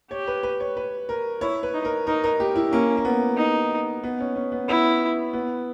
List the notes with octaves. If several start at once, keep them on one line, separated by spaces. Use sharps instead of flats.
G4 C#5
B4
B4
C#5
B4
A#4
E4 C#5
B4
D#4
A#4
D#4 A#4
A#4
G4
E4
A#3 C#4
A#3
B3
D#4
B3
C#4
C#4
B3
B3 E4
B3